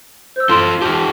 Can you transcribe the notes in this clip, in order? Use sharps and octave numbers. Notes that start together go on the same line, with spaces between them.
C5 E6
F4 A4 C6 D7
F4 G4 A5